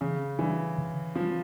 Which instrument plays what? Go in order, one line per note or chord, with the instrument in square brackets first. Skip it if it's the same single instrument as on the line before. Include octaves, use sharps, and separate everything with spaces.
[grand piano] C#3 [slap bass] E3
[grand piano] E3 [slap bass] G3 B3 D4
[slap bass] D3
[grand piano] F3 [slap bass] G3 C4